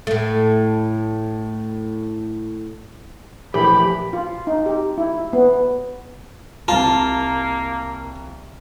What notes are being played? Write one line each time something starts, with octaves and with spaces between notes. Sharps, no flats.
A2 A3
A#1 E3 A3 G4 B5
F4
D#4
G4
E4
B3
C2 A#3 F4 A5 A#5